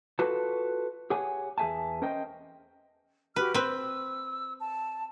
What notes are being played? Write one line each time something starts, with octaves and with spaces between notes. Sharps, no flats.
F4 F#4 A4 B4 A5
G4 G#4 C#5 F#5 G#5
E2 G#4 C5 E5 G#5 A5
C#4 A#4 C5 D#5 G5
F#4 G4 B4 F6
C4 B4 E6
A5